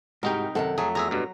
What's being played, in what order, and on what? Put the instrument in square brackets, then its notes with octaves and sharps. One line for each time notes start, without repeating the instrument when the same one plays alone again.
[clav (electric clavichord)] C2 D#4 G5 [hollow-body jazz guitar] G#2 [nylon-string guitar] F#4 G4 [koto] A#4
[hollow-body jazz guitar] F#2 C3 D#3 [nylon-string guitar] A4 F#5
[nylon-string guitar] F2 [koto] F#3 [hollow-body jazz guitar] A3 [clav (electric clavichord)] G#4
[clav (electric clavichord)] E2 G#4 E5 [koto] A#5
[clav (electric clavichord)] G2 B2